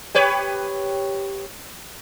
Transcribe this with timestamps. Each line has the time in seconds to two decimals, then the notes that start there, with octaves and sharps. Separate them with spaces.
0.15 G4 B4 C#5